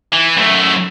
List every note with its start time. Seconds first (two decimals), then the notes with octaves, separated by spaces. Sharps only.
0.13 E3
0.37 F#2 A3